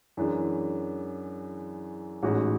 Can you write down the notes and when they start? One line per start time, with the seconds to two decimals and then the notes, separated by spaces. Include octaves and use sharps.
0.17 F#2 E3 G#3 D4
2.22 A1 G#2 G#3 C#4 F#4